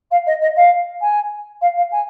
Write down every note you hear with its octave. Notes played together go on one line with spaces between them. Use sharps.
F5
D#5
D#5
F5
G#5
F5
F5
G#5